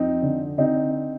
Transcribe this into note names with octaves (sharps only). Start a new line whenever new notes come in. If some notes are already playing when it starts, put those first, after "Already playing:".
Already playing: F2 C4 D#4
D3
D3 C4 D#4